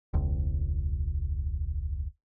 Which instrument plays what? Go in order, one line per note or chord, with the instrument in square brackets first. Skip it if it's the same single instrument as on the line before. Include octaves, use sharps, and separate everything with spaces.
[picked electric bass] E1 C#2